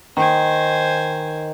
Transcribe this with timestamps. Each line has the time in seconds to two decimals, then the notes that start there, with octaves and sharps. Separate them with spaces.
0.17 D#3 C5 G#5